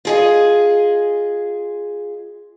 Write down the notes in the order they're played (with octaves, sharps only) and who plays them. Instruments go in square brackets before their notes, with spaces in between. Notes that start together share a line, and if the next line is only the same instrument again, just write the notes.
[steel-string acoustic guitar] F4 G#4 D#5